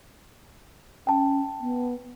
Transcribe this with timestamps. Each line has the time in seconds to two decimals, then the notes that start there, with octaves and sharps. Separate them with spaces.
1.07 C#4 G5 A5
1.61 B3